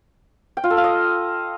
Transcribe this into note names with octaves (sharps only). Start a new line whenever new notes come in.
G5
F4
A4
F5
D#5